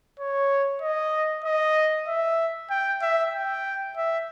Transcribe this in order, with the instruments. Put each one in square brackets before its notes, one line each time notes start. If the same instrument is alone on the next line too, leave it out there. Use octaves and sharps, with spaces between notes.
[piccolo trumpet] C#5
D#5
D#5
E5
G5
E5
G5
E5